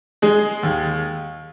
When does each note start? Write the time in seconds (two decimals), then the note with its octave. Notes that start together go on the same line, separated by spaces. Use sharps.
0.22 G#3 G#4
0.63 D#2